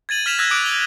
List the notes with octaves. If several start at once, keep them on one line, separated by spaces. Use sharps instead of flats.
G#6 A6 D#7 F#7
F6 B6 E7 F7
E6 F#6 G#6 A#6
D6 D#6 F#6 D7
G7